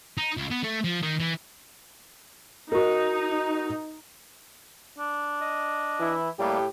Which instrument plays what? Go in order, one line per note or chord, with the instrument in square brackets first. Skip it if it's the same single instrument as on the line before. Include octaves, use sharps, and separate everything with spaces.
[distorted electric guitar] D#4
C#2
B3
A3
F3
D#3
E3
[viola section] D#4 [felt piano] F#4 A#4
[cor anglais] D4
[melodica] D#5
[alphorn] E3 [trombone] E4
[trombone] A2 [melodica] G3 A#3 [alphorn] G4